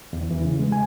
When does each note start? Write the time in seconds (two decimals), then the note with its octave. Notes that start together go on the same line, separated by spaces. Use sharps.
0.13 E2
0.31 E3
0.44 C#3
0.59 G#3
0.72 G#5